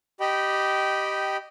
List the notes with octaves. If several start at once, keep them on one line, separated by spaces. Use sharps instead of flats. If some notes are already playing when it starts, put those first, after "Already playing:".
G4 D#5 G5 B5